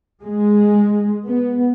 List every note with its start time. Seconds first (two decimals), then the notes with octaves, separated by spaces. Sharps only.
0.24 G#3
1.27 B3